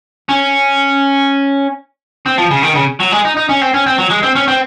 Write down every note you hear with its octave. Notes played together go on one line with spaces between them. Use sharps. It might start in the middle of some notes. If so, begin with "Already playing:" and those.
C#4
C4
F3
C#3
D#3
C#3
F#3
G#3
D#4
D#4
C#4
C4
C#4
C4
F#3
G#3
C4
C#4
C4